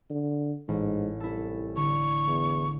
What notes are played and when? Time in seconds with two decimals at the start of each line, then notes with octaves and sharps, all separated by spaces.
0.10 D3
0.68 A1 G#2
1.20 C2 E4 A4
1.76 D3 C#6
2.28 E2